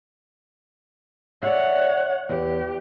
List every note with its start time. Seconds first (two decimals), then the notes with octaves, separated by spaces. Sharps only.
1.43 C#5 D5 E5 F#5
2.29 E2 G4